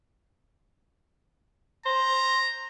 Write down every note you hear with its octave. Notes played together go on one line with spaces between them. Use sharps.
C5 A#5